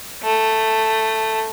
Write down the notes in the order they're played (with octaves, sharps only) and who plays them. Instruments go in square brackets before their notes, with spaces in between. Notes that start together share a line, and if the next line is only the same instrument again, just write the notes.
[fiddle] A3